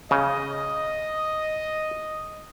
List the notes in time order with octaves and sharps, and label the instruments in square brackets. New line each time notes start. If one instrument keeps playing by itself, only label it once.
[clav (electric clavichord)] C#3 [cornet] D#5